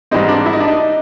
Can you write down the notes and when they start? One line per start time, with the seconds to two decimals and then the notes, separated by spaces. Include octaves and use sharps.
0.11 G#2 E3 G3 C4 D#4
0.28 D4
0.46 E4
0.53 D#4
0.60 D4
0.68 D#4